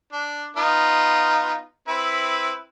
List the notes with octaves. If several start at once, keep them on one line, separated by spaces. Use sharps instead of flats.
D4
B3 D#4 F4
C4 E4 B4